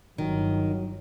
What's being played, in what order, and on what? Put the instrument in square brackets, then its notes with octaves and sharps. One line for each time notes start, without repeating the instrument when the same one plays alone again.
[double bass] G1 [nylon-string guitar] D#3 [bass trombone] F#3